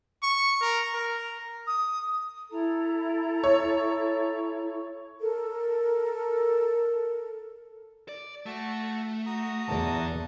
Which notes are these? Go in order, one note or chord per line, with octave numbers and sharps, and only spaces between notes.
C#6
A#4
A#4
D#6
E4 A4 A#5
C#5
A4 A#4
D5
A3 F#4 A5 E6
F#4 A#5 D#6
E2 A4 D5 A5